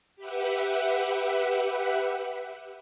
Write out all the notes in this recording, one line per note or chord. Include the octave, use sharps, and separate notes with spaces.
G4 B4 E5 F#5